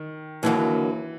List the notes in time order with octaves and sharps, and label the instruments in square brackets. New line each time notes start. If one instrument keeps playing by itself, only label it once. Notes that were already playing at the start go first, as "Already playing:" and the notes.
Already playing: [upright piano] D#3
[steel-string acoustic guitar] D#2 D3 F#3 A#3 [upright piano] E3